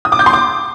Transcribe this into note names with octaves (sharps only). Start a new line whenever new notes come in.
D#6
D6
G6
C6
D6